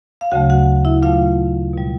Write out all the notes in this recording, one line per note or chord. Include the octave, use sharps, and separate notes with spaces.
F5
D2 C#3 F#3 A3 F#4 F#5
F#4 F#5
E4 E5
A#2 F#3 A3 F4 F5
B2 G3